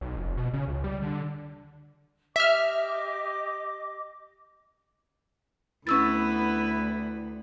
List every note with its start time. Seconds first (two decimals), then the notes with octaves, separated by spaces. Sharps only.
0.01 B1
0.17 F1
0.37 B2
0.53 C#3
0.68 C#2
0.84 G3
1.02 D3
2.36 G4 D#5 E5 D6 F6
5.87 D2 B3 C#4 E4 B4 E6 A6